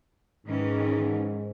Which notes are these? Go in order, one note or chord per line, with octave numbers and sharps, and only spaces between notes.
G#2 D#3 E3 C#4